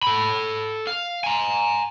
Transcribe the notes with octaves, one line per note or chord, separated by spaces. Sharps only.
A4 B5
F5
G#5 A#5